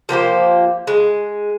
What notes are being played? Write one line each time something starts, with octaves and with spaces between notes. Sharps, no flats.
F3 A#3 G4 C5
G#3